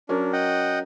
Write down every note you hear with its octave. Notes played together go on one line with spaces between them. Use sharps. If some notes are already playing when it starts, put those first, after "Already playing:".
F#3 C#4 D4 A#4
D#5 F#5 G5